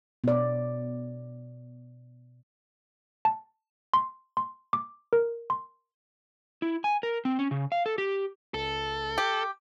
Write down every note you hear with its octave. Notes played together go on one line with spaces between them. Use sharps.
B2 D5
A5
C6
C6
D6
A#4
C6
E4
G#5
A#4
C4
C#4
C#3
F5
A4
G4
C#2 A4
G4